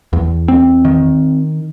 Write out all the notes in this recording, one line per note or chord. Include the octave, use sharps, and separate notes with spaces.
E2
C4
D#3